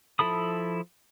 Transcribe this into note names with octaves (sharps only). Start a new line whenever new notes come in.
F3 E4 A4 B5 D#6